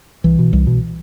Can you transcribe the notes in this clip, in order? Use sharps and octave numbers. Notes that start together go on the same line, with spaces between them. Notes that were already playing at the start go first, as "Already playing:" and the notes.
C2 E3
B2
C2
B2